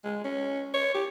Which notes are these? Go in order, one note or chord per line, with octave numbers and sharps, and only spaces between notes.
G#3
C#4
C#5
G4